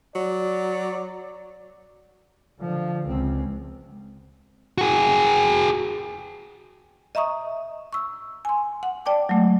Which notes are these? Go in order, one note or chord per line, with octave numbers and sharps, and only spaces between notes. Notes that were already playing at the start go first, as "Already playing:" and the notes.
F#3 D5
D3 F3
C#2 C4
F#4 G#4
D#5 E5 A#5 C#6 D#6
C#6 E6
G#5 C6
F#5
D5 G5 A5 D6
F#3 G#3 A3